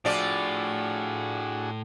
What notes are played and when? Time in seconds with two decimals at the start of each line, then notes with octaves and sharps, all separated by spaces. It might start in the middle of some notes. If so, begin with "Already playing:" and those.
0.05 A2 F3 D4 F#4 G#4 D5